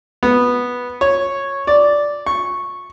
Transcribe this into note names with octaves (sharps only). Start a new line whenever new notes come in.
B3
C#5
D5
C#6